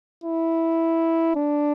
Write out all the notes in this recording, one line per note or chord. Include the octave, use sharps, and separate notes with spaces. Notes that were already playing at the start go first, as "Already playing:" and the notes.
E4
D4